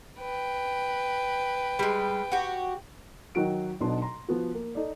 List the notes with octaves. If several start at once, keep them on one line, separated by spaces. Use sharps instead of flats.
B4 G5
G3 G#3
F#4 G4
D#3 F#3 F#4 D7
B1 B2 F#3 D4 D#4 C6
A#5 C6
F3 B3 F#4
A#3
D#4 A4 D5